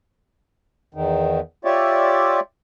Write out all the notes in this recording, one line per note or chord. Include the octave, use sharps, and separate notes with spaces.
E2 D#3
F4 G4 C#5 D5 E5